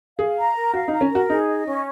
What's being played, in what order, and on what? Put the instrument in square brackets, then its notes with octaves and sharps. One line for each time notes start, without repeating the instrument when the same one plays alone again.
[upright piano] G#4 [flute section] F5
[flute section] A#5
A#4
[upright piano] F#4 [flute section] F5
[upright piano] D#4
[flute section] A#5
[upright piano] C#4
[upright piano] F#4 [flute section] A#4
[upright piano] D#4 [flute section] G#4
[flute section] D#5
C#4